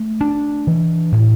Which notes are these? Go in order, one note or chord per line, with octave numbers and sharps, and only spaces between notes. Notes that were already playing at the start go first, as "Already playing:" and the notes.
Already playing: A3
D4
E3
A2